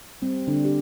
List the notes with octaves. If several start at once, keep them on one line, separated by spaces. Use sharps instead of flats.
G3 C4
D3 D4
G4